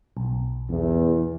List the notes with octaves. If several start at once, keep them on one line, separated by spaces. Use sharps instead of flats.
B1
E2